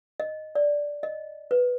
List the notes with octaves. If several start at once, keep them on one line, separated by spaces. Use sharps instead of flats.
D#5
D5
D#5
B4